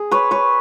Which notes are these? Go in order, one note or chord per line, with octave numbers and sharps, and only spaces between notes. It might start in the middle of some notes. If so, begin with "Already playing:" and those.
Already playing: G#4
B4 C#5
B4 C#5